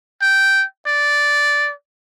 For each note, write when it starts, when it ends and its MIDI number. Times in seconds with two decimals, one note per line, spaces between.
0.22 0.65 79
0.86 1.72 74